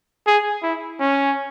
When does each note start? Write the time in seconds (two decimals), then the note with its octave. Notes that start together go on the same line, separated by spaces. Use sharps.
0.27 G#4
0.63 E4
1.00 C#4